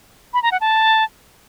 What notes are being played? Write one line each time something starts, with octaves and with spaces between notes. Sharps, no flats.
B5
A#5
F#5
A5